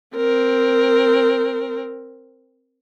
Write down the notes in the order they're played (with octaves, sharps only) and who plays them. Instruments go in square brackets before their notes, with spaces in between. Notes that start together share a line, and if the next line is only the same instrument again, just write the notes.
[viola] C4 A#4